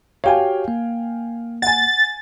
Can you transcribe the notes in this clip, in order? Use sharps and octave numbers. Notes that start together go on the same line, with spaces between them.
F#4 G4 C#5 F5 G5 G#5
A#3
F#5 G#5 A6